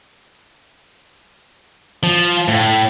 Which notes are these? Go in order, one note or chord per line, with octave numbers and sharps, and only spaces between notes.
F3
A2